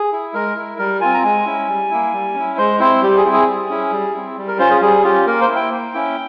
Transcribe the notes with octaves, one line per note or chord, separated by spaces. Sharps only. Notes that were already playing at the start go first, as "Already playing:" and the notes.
Already playing: G#4
E4
G#3 A#4
E4
G3 A#4
C4 F4 G#5
A#5
G#3 G#5
C#4 E4
G3
A#3 E4
G3
C#4 E4
G#3 C5
C4 E4 C5
G3 G4
G#4
C4 E4
G#4
G3
C#4 E4
G3
C4 E4
G3
A#4
C#4 F4 C5
G#4
G3 G#4
C#4 F4 G4
A#3 A#4
C5
E4
G5
A#3
C#4 E4